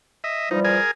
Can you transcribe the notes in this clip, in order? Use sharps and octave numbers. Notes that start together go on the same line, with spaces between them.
D#5 E5
E3 F3 G3 D#4
G#4 A#4 G#5